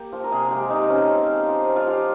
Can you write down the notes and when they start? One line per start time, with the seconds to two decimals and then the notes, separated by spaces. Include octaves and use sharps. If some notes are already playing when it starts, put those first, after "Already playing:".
Already playing: A#3 G4
0.13 F3
0.24 A#4
0.32 C3 G#4
0.51 G#3 G4
0.70 C3 D#4
0.90 F3 C#4
1.09 C4
1.29 C4
1.48 F3
1.67 C4
1.76 F4
1.86 F3 G4